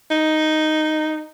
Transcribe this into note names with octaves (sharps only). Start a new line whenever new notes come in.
D#4